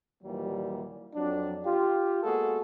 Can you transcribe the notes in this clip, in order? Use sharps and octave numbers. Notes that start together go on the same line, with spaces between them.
D#2 A#2 E3 F#3 G3 A#3
F2 F#3 D4
F4 G4
G#3 A#3 B3 F#4 G#4 A4